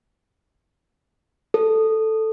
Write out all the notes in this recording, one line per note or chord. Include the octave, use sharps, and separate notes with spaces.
A4